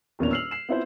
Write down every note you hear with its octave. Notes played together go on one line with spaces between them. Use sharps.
D#1 E2 A#3 C#4 D4 F7
E6 F6 C7 F7 F#7
C7 E7
B3 C4 E4 F4 C5